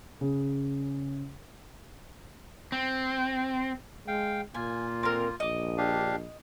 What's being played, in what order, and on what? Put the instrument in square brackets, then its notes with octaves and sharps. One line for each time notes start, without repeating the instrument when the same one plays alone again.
[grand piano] C#3
[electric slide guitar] C4
[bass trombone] G#3 [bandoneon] F5 G5
[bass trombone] A#2 [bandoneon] A#3 F4 [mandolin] G#5
[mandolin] C4 A#4
[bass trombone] A#1 [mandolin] D#5 D6
[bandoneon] D4 G4 F5